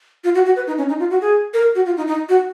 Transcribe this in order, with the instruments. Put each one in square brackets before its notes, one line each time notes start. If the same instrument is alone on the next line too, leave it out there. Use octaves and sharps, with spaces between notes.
[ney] F4
F#4
F#4
B4
D#4
C#4
D#4
F4
F#4
G#4
A#4
F#4
F4
D#4
D#4
F#4